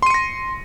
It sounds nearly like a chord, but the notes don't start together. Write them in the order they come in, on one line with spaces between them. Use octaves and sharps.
C6 D#7 C#7 A#6